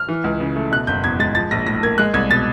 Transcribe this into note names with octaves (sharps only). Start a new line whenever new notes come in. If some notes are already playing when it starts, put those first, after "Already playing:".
Already playing: F6
E3
C#2
C#3
A3
B2 F#6
F#1 G6
E2 G#6
G#3 A6
F3 A6
A#1 A#6
A2 A#6
A#3 G#6
G#3 F#6
C2 G#6
B2 A6